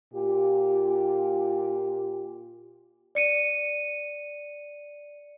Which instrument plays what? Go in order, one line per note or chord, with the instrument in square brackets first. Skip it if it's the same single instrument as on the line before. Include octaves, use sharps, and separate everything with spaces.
[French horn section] A#2 F4 G4
[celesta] D5 C#7 D#7